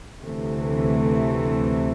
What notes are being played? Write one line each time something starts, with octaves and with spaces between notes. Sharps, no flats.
D2 C3 E3 A3